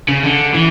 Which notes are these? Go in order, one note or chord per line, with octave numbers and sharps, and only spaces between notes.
C#3
D3
E3